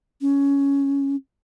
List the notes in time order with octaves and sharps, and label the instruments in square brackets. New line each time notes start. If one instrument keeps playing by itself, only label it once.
[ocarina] C#4